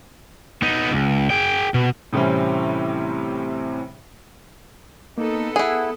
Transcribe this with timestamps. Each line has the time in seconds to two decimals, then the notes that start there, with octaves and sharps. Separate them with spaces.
0.62 B3 D#4
0.91 C#2
1.30 G#4 G5
1.74 B2
2.13 A2 C3 E3 G3 C4 C#4
5.18 A#3 B3 D#4 A4
5.56 E4 G#4 F#5 D#6